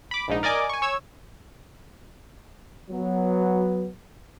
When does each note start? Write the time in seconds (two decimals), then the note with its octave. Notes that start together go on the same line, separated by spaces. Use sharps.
0.11 B5 D6
0.28 A#1 G#2 D#4
0.43 A#4 D5 D#5 G#5 D6
0.69 G#5 C#6
0.82 C#5 E6 G#6
2.91 F#3 B3